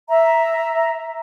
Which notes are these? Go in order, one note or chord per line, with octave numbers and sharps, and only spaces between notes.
E5 A#5